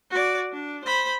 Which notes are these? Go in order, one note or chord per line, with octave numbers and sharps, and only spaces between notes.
F#4 D5
D4
C5 B5